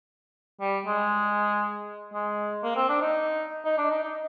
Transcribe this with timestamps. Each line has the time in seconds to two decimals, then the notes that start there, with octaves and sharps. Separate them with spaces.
0.61 G3
0.86 G#3
2.14 G#3
2.63 A#3
2.76 C4
2.89 D4
3.02 D#4
3.65 D#4
3.78 D4
3.91 D#4
4.04 D#4